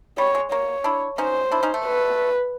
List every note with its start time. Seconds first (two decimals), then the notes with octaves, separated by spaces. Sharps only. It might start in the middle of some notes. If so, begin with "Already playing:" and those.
0.18 G3 C#5
0.35 G#3
0.51 A#3 C#5
0.84 D4 E4
1.18 C#4 D#4 C5
1.51 D4 E4
1.63 C#4 D#4
1.74 A3
1.85 B4